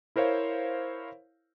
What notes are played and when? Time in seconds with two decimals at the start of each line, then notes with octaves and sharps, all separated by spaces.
0.16 E4 A#4 C5 C#5 F5